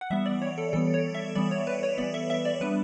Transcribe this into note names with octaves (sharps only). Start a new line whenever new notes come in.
F#5
E3 G3 B3 E5
D5
C#5
A4
E3 G3 B3 A4
C#5
E5
E3 G3 B3 D5
C#5
B4
C#5
E3 G3 B3 D5
E5
E5
D5
G3 B3 D4 B4